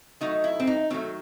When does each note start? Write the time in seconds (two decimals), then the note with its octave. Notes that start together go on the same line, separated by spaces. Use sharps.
0.21 D#3 F#3 A3 D#4
0.44 E4
0.60 C4
0.67 D#4
0.90 D#3 F#3 A3 C4